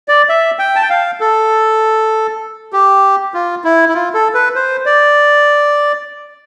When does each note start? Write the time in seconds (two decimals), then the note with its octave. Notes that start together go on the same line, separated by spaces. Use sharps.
0.08 D5
0.29 E5
0.59 G5
0.76 A5
0.82 G5
0.90 F5
1.20 A4
2.73 G4
3.34 F4
3.64 E4
3.89 E4
3.95 F4
4.14 A4
4.34 B4
4.55 C5
4.86 D5